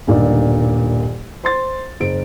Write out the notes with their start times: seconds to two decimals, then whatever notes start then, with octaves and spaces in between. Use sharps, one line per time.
0.07 D#1 B1 G2 A#2 D3 D5
1.44 C5 C6 A6
2.00 F#1 C5 D7